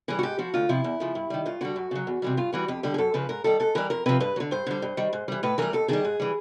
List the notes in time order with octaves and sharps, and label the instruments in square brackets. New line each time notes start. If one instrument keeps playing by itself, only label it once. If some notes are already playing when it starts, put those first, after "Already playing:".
[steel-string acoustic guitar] E3 G3 G#4
F#4
G#2 G4
F3 F#4
D2 F4
C3 F3 E4
E2
C#3 F3
G2
D#3 G3
G2 F4
D3 G3 F#4
F#2
C#3 F#3
E2
C3 E3 G3
G2 F4
E3 G3 F#4
F2 G4
D3 G3 G4
G#4
F#2 A4
C#3 F3 B4
G#2 A#4
D#3 G3 A4
G#2 A4
E3 G3 A#4
F2 A#4
C3 F3 B4
G2 B4
F#3
D3
G2 C5
D3 G3
G2
D#3 G3
G#2
E3 G3
A2 B4
E3 G3 A#4
D#2 A4
D#3 G3 G#4
G#2
E3 G3